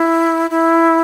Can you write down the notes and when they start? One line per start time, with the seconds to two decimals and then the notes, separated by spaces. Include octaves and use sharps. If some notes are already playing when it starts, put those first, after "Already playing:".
Already playing: E4
0.50 E4